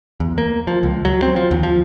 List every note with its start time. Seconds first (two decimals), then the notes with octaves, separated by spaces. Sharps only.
0.20 E2
0.38 A#3
0.67 F3
0.83 C#2
1.05 F#3
1.22 C4
1.36 F3
1.51 D#2
1.63 F3